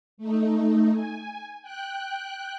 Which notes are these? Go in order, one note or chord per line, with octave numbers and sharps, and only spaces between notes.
A3 D#4
G#5
G5 F#6